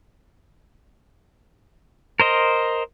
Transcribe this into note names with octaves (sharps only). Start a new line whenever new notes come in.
A#4 C5 D#5